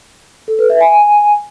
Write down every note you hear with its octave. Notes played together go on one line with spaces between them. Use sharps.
A4
B4
E5
G#5